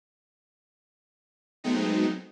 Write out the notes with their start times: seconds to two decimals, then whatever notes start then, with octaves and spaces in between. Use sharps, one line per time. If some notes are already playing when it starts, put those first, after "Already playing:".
1.64 F#3 G#3 A3 B3 C4 D#4